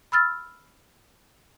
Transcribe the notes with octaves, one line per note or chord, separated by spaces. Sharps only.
B5 E6 F6 A6